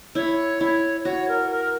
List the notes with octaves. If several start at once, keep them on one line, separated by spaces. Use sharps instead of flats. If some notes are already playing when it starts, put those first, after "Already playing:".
E4 C#5
E4
F#4 C#5
A#4
A#4